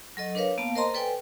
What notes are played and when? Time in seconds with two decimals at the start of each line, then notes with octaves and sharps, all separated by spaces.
0.17 F#3 A4 D#5
0.35 D4 A#4 B4 C#5 F5
0.58 A#3 B3 F5 A5
0.76 A#4 C5 D#5 A5 A#5 C6
0.94 A4 B4 D5 G5 G#5